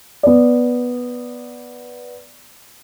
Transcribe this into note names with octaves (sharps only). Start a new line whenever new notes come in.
B3 D5